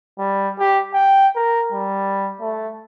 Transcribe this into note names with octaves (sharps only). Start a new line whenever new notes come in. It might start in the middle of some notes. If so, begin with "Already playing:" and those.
G3
G4
G5
A#4
G3
A3